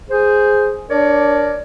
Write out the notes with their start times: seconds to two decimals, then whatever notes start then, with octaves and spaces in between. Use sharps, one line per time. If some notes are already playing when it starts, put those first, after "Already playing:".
0.10 G#4 C5
0.89 D4 A#4 C#5 D5